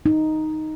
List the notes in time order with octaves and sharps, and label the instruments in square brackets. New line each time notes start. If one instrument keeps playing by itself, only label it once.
[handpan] D#4